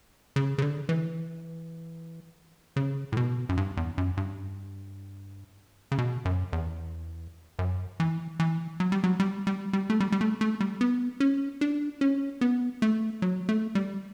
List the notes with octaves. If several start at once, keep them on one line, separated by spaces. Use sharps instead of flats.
C#3
C#3
D3
E3
C#3
A2
B2
F#2
G2
E2
F#2
G2
C#3
B2
F#2
E2
F#2
E3
E3
F#3
G3
F#3
G3
G3
G3
A3
G3
G3
A3
A3
G3
B3
C#4
D4
C#4
B3
A3
F#3
A3
G3